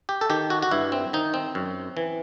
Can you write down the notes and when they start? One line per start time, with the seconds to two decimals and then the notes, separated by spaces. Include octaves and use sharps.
0.09 G4
0.21 A4
0.30 D#3 G4
0.50 F#4
0.62 F#4
0.71 G2 E4
0.92 C4
1.13 D#3 D#4
1.34 C4
1.55 F#2
1.97 E3